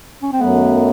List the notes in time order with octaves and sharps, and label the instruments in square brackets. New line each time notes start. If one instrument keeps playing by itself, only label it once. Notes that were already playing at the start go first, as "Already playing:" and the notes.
[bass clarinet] C#4
C4
[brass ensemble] F#2 D#3 F#3 A3 [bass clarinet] B3